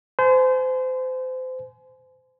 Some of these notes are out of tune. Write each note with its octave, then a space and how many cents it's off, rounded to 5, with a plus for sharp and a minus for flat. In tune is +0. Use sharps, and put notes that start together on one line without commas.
C5 -30 G#5 +30